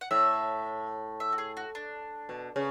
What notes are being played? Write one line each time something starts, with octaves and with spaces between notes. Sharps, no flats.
F#5
A2 E5
E5
F#4
G#4
F#4
D4
B2
C#3